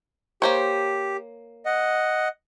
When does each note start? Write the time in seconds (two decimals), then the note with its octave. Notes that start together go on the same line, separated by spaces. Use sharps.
0.42 A#3 G4 C5 C#5
1.66 D#5 F#5